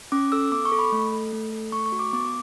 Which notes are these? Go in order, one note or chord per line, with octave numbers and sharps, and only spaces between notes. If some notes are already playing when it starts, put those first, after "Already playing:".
C#4 D6
A4 E6
B3 D6
C#6
A4
B5
A3
A4
A3
A4
A3 C#6
C#6
F#4
D6
B3 D6